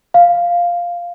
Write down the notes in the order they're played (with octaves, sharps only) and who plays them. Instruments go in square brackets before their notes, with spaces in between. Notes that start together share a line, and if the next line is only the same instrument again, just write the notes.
[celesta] F5